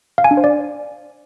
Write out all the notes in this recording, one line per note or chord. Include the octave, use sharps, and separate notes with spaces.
F5
G#5
D4
C5
D5